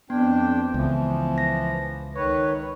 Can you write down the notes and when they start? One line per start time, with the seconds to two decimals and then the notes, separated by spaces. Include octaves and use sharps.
0.10 F2 B3 D4 G5
0.74 C#2 E3 F3
1.38 A#6
2.16 D#3 B4 C#5 C#6